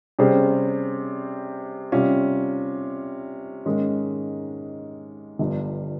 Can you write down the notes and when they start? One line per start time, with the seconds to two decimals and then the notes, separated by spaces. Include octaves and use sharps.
0.19 C3 G3 C#4 G#4 C5
1.92 C3 G3 C#4 F4
3.66 G#2 D#3 G#3 C#4
5.39 G1 G2 F3